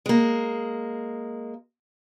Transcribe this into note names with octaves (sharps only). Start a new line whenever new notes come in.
G#3 A#3